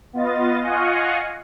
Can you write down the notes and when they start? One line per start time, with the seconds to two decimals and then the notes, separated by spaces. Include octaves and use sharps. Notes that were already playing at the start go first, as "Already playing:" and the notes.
0.13 B3 F4 D#5 A6
0.60 F4 D#5 F5 F#5 G#5 C#6